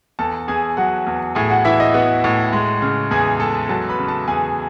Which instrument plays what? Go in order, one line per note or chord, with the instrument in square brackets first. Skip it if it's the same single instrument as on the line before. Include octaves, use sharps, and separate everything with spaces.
[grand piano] E2 A4 A5
E2 G#4 G#5
F#3 F#4 F#5
E2
A2 G#4 G#5
F#4 F#5
E3 E4 E5
D#5
B3 F#4 F#5
A2
G#3
C#3
E2 G#4 G#5
G#3 A4 A5
F#3 A4 A5
B4 B5
C#3
A4 A5
E2 G#4 G#5